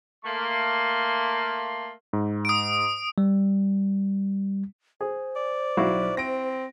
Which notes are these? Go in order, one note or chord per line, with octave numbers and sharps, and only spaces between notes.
A3 A#3 C6
G#2
D#6 D7
G3
G#4 C5
D5
B1 E4 F#4 F5
C4 A#6 D7